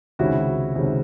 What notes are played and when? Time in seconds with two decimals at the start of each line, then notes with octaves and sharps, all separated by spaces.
0.19 C#2 C3 D#3 G#3 C#4 E4 F#4
0.75 C#2 C3 D#3 G#3 C#4